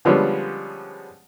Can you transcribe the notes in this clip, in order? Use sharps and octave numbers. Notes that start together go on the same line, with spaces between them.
D3 F3 G3 G#3 B3 C#4